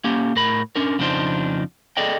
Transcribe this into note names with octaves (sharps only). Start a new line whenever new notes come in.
A#3 C#4 G4
A2 A#4 B5
C#4 D4 A#4
F2 C#3 F3 D4 D#4 C5
G#4 A4 D5 D#5 G5